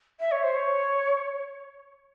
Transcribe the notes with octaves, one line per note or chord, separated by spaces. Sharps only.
E5
C#5
C5
C#5